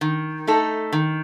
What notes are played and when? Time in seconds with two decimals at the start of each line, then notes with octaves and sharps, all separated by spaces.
0.01 D#3
0.47 A3 D#4 A4
0.92 D#3